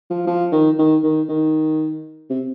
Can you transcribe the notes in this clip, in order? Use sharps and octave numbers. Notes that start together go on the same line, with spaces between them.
F3
F3
D#3
D#3
D#3
D#3
C3